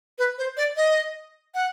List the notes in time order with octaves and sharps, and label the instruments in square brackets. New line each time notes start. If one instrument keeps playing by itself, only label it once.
[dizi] B4
C5
D5
D#5
F#5